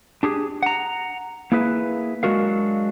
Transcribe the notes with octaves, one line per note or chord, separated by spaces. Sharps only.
D4 G4 G#4
F#5 A#5
A#3 E4 G#4 B4 E5
F#3 G#3 D4 F#4 A#4 F5